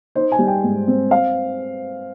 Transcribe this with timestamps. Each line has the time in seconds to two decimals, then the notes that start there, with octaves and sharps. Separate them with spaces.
0.15 D#4 C5
0.32 G#5
0.39 G3
0.47 G5
0.64 G#2
0.88 C4
1.11 F5